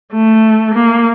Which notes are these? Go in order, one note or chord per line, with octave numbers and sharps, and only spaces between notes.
A3
A#3